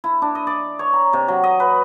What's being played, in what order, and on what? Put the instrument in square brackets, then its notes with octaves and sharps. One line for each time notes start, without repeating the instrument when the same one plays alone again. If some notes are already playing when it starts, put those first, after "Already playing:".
[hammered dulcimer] E4
D4
D#5
D5
C#5
A#5
C3
F#3
D#5
B4